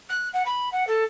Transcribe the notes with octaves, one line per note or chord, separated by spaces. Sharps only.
F#6
F#5
B5
F#5
A4